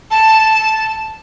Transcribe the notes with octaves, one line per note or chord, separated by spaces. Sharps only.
A5